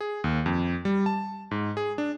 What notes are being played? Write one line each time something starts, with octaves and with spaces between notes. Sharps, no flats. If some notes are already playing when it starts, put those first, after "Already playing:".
G#4
D#2
F2
G3
A5
G#2
G#4
D4